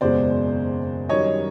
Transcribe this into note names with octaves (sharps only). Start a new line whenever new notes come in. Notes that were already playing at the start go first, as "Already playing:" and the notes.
F#1 E2 B2 G#3 C5 D5
F#2 D#3 G3 C#5 D#5